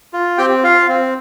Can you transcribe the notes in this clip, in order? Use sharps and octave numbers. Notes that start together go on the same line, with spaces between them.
F4
C4 G4 G5
F4 F5
C4